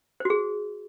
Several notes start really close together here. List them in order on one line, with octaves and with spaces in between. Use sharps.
C5 F#4 G#4